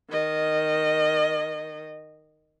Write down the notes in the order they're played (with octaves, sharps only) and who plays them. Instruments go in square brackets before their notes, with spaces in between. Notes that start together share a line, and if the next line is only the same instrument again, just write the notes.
[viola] D#3 D#5